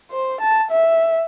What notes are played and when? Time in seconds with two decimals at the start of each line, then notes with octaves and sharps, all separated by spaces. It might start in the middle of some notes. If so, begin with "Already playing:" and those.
0.11 C5
0.41 A5
0.71 E5